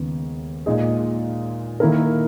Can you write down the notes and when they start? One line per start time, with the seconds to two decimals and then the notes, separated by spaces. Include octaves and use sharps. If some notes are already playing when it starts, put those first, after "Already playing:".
Already playing: D#2 C#3 G#3 B3
0.66 A#2 G#3 D#4 G#4
1.80 D#3 A#3 E4 A#4